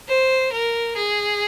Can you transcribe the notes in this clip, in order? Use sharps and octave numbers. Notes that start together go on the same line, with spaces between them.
C5
A#4
G#4